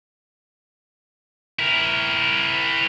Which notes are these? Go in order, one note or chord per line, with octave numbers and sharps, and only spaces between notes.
E4 A#4